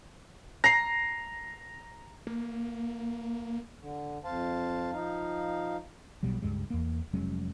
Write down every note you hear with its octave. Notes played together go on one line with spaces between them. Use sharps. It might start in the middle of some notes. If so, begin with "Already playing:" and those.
A#5 A#6 C7
A#3
D3
F2 C5 F5 A5
F3 D#4 F5
B1 B2 F#3 G3
C#2 G2 G3 G#3
E2 A#3
F1 F#3 G#3 C#4